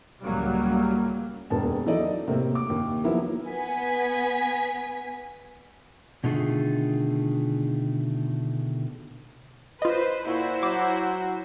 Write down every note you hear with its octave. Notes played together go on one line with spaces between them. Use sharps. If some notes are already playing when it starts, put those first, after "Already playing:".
C#2 A2 C#3 F#3 G3 A#3
E1 D#2 A#3 B3 A5
E3 F#3 D#4 A4 D5 D#5
A2 C3 A#3
D6
D#2
D#3 F3 F#3 A#3 B3 E4
B3 G#5 B6
B2 D3 D#3 A3 F4 G#4
F4 B4 C5 D#5
A#2 E4 F#4 C5
F#3 D6